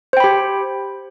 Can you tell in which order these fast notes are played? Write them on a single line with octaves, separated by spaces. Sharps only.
C5 G5 B5 G4